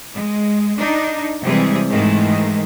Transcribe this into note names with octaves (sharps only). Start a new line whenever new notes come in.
G#3
D4 D#4
C3 E3 G3 G#3 G#4
G#2 D#3 E3 G#3 A3